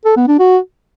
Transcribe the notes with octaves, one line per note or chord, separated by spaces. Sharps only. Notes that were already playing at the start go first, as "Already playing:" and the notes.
A4
B3
D4
F#4